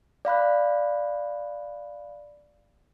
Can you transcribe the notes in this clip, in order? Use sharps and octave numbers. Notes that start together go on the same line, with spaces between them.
D5 F5 B5 F#6